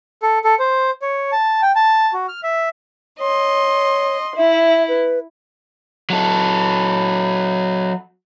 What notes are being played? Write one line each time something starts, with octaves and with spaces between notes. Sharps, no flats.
A4
A4
C5
C#5
A5
G5
A5
F#4
F6
E5
C#5 D#5 C6
E4 E5
B4
F#3 A4